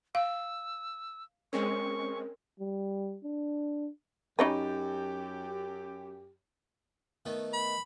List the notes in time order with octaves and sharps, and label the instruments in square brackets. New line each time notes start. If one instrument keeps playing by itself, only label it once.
[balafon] F5 [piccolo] E6
[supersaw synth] G#3 C4 C#4 [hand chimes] A#4 [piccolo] C#6
[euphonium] G3
D4
[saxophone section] F#2 G4 [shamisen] C#4 D#4 B4
[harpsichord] D#3 A3 B3
[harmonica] B5